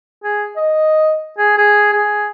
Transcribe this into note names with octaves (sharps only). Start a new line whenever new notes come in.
G#4
D#5
G#4
G#4
G#4